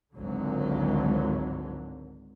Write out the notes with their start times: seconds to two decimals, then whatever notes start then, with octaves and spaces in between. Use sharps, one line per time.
0.15 G#1 C#2 G#2 D3 F#3